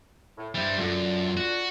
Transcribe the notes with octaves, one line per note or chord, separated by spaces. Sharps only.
A2
G2 G3 E4 C5
F#2 D3 F4
F#4